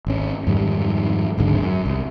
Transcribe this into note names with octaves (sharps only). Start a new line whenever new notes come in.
G#1 C#4
F2 G#2 D#3 G3
D1 G#1 G#2 D3
F#2
C2